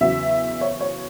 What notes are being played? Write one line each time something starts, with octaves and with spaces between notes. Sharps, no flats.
E2 C#3 F#3 E5
C#5
C#5